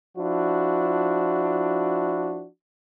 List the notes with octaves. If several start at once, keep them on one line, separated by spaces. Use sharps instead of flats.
F3 D4 E4 F#4